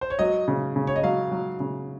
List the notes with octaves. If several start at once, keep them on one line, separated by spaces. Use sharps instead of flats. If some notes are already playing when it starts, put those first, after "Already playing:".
C5
C#5
F#3 D#5
C#3
C#3
C#5
D#5
F#3 F5
F#3
C#3